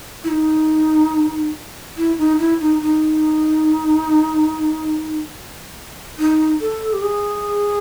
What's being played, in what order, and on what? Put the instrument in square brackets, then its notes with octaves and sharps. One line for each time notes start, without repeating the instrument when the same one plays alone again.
[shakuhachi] E4
D#4
E4
D#4
E4
D#4
D#4
D#4
A4
G4
G#4